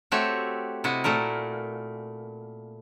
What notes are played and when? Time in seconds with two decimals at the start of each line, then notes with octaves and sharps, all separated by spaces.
0.12 A3 C4 F#4 G4 C#5 E5
0.84 C3 E4 F#4 D#5
1.04 A#2 A3 E4 A#4